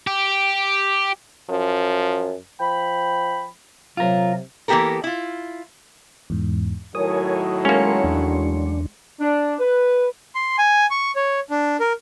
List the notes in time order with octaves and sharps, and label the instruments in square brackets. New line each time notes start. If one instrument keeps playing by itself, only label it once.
[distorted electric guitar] G4
[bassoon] F#2 [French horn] F3
[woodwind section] F3 G5 B5
[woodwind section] C3 F#3 [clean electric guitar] F4 A#4
[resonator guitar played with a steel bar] E3 A#3 B3 G4 A4 A#4
E4 F4
[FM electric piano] E2 G#2
[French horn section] A2 D#3 F#3 [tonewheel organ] A#4 C#5 G#5 [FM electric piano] D#6
[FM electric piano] G#3 C6 C#7 [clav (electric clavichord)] A#3 C#4 [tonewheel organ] A#4
[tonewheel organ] E2 D4
[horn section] D4
B4
[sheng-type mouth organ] C6
G#5
C#6
C#5
D4
A#4